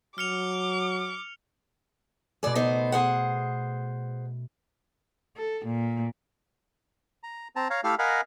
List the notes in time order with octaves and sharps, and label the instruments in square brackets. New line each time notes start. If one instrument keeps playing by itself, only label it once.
[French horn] F#3 [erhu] D6 [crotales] F6 C#7 F7
[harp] B2 A3 [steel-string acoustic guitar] G#4 D5
[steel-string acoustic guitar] B3 D#4 C5
G#4 C5 F#5
[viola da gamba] A4
A#2
[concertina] A#5
C4 A5 A#5
C#5 F5 A#5
A3 E4 G4 A4 F5 F6
A#4 D#5 F5 F#5 G#5 B5